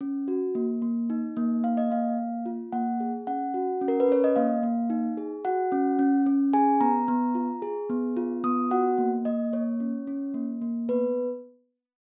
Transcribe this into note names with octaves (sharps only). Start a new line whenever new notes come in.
C#4
F#4
A#3
A#3
D#4
A#3
A#3 F5
D#5
A#3 F5
A#3
F4
A#3 F#5
G#4
C#4 F#5
F#4
C#4
A#4
B4
C#4 C#5
D#5
A#3 F5
A#3
D#4
G#4
F#4 F#5
C#4
C#4
C#4
G#4 G#5
B3 A#5
B3
F4
G#4
B3
F4
B3 D#6
F#4 F#5
A#3
A#3 D#5
A#3 C#5
C#4
C#4
A#3
A#3
B3 B4